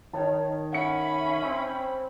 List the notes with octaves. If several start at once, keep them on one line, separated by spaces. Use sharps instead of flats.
D#3 C#5 A5
C#4 E5 F#5 B5 C#7
C4